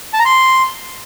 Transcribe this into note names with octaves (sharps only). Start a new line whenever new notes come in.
A5
A#5
C6